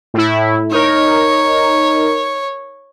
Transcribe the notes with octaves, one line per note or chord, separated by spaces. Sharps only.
A2 E4
D#4 A#4 C#5